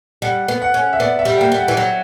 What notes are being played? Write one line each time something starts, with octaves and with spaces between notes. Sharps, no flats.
G3 F#5
B3
F#5
C#4
E5
B3 D5
E5
G3
G5
A#3
G3
F#5
E3
F#3